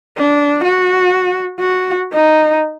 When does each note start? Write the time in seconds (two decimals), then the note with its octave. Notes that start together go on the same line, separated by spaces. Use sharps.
0.18 D4
0.64 F#4
1.60 F#4
2.13 D#4